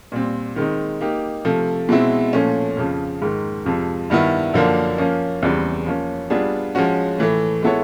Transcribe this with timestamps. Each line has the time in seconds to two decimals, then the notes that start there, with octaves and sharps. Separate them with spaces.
0.12 A#2 G3 C4
0.56 D#3 G#3 C4 D#4
1.01 A#3 D#4 G4
1.45 C3 F3 A3
1.89 B2 G#3 C4 E4
2.33 A#2 F3 A3 C#4
2.77 F2 C#3 F3
3.22 G#2 D#3 G#3
3.66 F2 C3 F3 G#3
4.10 G2 D#3 G3 B3 E4
4.54 F#2 D3 F3 A#3 D4
4.98 F3 A#3 C#4
5.43 E2 C#3 E3 G3 C4
5.86 F3 A#3 C#4
6.30 G3 B3 D4 F4 G#4
6.75 F3 G#3 C#4 F#4
7.18 A2 E3 A3
7.63 G#3 B3 E4 A4 C#5